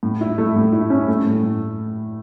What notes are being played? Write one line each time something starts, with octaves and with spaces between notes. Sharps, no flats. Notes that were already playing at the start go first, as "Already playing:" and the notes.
A2
E4
A3
A2
E4
C#4
A3
A2
A2